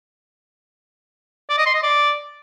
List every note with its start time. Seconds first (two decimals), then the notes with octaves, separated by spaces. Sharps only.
1.50 D5
1.58 D#5
1.66 C6
1.74 D#5
1.83 D5